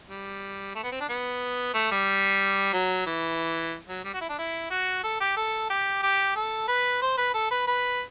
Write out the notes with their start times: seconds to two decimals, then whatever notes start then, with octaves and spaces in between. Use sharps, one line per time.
0.09 G3
0.75 A3
0.83 B3
0.92 C4
1.00 D4
1.09 B3
1.74 A3
1.92 G3
2.73 F#3
3.06 E3
3.89 F#3
4.04 G3
4.14 F#4
4.21 E4
4.29 D4
4.38 E4
4.71 F#4
5.04 A4
5.20 G4
5.37 A4
5.70 G4
6.03 G4
6.36 A4
6.68 B4
7.02 C5
7.18 B4
7.34 A4
7.51 B4
7.67 B4